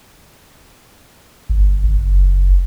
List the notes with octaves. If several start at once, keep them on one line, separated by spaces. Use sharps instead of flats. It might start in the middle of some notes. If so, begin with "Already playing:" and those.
G1
F#1